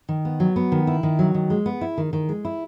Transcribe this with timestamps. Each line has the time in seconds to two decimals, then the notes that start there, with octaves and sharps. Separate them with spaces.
0.09 D#3
0.25 B3
0.40 F#3
0.56 B3
0.72 D#3
0.87 E4
1.03 D#3
1.19 F#3
1.34 D#3
1.50 G#3
1.66 B3
1.81 E4
1.98 D#3
2.13 D#3
2.29 G#3
2.45 E4